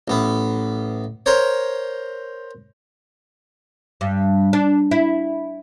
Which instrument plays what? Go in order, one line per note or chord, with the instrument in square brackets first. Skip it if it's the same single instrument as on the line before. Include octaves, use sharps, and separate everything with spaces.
[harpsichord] A1 B3
A#4 C5 C#5
[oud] G2
D4
E4